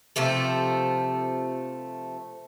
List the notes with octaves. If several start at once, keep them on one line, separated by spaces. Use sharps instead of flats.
C3 F3 A3 A4